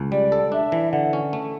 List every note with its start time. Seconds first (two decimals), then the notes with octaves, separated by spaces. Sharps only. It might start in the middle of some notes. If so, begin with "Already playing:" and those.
Already playing: C#2
0.12 G3 D5
0.32 A4
0.52 D4 E5
0.72 E3
0.92 D3 F#5
1.13 C#4
1.33 A3